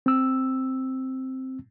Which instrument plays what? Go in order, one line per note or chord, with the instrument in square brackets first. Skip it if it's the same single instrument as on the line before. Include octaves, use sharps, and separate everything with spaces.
[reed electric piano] C4 E6